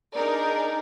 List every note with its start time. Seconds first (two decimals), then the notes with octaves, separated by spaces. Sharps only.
0.14 D4 D#4 G#4 A#4 D5